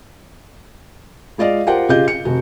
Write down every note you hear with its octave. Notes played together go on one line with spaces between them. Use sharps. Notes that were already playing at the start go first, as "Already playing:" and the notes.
G#3 F4 D5 D#5 F5
F4 G4 A#4 C5 F#5 G5
C#3 F4 G4 G#4 D#5 G6
C#7
F1 F#4